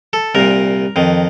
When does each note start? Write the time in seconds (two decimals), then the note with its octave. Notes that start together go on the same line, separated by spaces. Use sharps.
0.13 A4
0.35 C2 A#2 A#4
0.96 F2 D#3